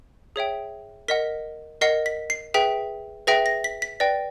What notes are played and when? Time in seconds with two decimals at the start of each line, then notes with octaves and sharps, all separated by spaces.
0.36 G#4 C#5 E5 G5
1.08 A#4 D#5 F#5 B6
1.81 A#4 D#5 F#5 C7
2.06 B6
2.30 C7
2.54 G#4 B4 E5 G5 B6
3.27 G#4 B4 E5 G5 A#6
3.46 A#6
3.64 B6
3.82 B6
4.00 B4 D5 G5 A#6